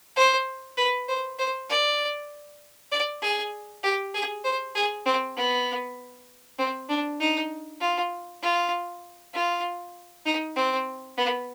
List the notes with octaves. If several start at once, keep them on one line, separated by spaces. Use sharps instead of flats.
C5
B4
C5
C5
D5
D5
G#4
G4
G#4
C5
G#4
C4
B3
C4
D4
D#4
F4
F4
F4
D#4
C4
B3